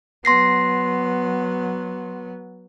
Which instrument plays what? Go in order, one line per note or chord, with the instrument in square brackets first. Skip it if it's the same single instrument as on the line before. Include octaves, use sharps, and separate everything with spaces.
[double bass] F#3 B3 [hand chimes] C6 A#6 C7